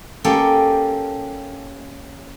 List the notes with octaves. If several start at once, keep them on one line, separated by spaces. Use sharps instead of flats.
A#3 C#4 G4 A4 G5